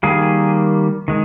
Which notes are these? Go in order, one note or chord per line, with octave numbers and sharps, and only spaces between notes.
D#3 G3 A#3 G#4
D#3 G#3